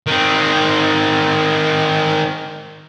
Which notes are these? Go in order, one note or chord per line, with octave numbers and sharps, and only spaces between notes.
D#3 C4